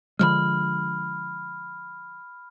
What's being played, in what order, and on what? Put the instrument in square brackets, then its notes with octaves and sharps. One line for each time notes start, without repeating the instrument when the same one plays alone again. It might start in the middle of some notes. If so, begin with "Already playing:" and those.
[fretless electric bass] D3 F3 G#3 [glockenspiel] B5 F6